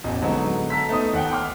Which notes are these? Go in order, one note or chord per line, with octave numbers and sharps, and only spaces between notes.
E1 A1 D#5
D3 F#3 G#3 B3 D#4
A4 A#5 E6 B6
A3 B3 D#4 D#6
D#2 F#5 G5
G5 C6 D6 F6